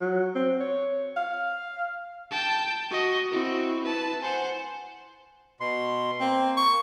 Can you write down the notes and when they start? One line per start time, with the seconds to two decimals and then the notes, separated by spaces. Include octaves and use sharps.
0.01 F#3
0.35 C4
0.60 C#5
1.16 F5
2.31 G5 A5
2.90 F#4 D#5
3.31 C4 E4 F#4
3.84 B4 A5
4.21 C5 F#5 G#5
5.60 B2 C6
6.21 A#3 C4
6.57 C#6